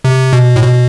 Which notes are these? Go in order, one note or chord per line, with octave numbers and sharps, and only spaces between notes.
C3
B2
A2
B2